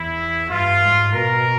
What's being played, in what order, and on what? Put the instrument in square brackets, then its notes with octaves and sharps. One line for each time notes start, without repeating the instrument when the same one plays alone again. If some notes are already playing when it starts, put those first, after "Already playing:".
Already playing: [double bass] E2 [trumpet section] E4
[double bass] G2 [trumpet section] F4
[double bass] G#2
[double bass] B2 [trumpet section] A#4